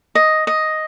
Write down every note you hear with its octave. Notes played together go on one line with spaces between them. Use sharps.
D#5
D#5